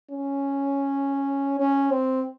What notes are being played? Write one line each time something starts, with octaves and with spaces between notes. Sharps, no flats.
C#4
C#4
C4